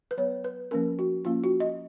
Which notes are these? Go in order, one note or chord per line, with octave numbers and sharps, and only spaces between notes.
B4
F#3 B3 C#5
B4
F3 A#3 C#4 A#4
F#4
F3 A#3 C#4 F4
F#4
D#5